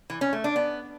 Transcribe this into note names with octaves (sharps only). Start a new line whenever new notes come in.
E3
C#4
A3
D4
B3